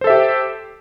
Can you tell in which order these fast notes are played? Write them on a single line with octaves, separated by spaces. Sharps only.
C5 A4 E5 G4